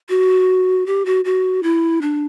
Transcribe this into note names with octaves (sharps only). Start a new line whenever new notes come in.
F#4
G4
F#4
F#4
E4
D4